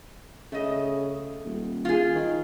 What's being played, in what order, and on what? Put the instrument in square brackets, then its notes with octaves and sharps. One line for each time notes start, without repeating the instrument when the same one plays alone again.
[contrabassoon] C#3 [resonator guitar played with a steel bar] A3 D#5
[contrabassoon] D#1
[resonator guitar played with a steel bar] F4 G#4
[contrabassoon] D#3